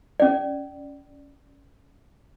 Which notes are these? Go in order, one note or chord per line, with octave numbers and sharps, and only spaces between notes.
C#4 D5